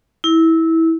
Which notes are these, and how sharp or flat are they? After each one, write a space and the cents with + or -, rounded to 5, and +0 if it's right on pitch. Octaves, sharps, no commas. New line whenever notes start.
E4 -20